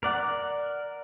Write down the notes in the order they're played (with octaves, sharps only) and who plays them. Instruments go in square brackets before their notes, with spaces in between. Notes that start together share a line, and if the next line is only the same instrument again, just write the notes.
[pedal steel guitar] A#4 D5 F#5